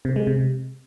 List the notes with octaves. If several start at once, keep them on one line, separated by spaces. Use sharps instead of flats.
C3
G#3
C3